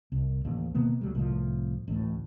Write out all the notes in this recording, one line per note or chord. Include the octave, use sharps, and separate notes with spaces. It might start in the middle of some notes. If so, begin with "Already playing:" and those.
C2
A1 D#2
B2 D#3 A#3 B3
D2 F#3 G3
C2 A2 F3
A1 D2 A2